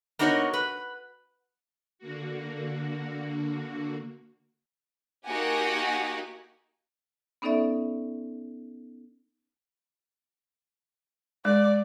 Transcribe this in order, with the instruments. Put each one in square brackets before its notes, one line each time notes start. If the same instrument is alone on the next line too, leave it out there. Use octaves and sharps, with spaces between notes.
[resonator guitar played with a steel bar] A#3 B3 D#4 F#4 A#4 C#5
B4
[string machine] D3 A#3 F#4
[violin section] A#3 D#4 F#4 G4 F#5 G#5
[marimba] B3 C#4 D#4 A4 D5 E5
[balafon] G#3 [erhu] D5